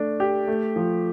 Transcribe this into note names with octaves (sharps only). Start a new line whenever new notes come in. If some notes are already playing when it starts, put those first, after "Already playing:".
Already playing: A3 D4
G4
A3
F3